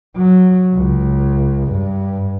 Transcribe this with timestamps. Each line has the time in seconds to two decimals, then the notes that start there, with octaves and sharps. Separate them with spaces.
0.17 F#3
0.75 C#2
1.72 G2